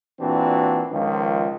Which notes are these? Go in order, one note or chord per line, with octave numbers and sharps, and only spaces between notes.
A#2 E3 C4 D4 F#4
C#2 D#3 F3